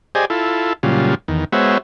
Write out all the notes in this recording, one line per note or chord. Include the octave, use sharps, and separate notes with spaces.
G4 G#4 C5 D5 D#5 G#5
E4 F4 A4
A#2 C#3 F#3 G3 F4
E2 D#3
G#3 B3 F#4 C5 C#5 E5